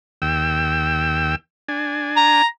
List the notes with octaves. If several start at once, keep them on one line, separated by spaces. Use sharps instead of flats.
D#2 G5 E6
D4 G#5
A#5